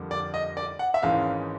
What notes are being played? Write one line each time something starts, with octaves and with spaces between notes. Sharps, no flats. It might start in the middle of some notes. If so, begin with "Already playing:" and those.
Already playing: F2 D3 G3 A#3
D5
D#5
D5
F#5
E5
G#1 G#2 E3 G#3 C#4 F5